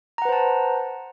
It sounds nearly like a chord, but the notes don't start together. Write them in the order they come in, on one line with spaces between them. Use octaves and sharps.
A#5 F#5 B4 C5 A5